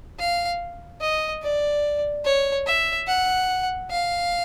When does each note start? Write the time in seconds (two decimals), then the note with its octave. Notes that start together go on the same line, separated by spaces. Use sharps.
0.19 F5
1.01 D#5
1.43 D5
2.25 C#5
2.66 E5
3.07 F#5
3.90 F5